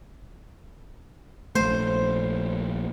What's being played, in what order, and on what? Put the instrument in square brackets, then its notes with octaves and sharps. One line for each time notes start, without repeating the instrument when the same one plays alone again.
[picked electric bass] A#1 A3 [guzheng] C5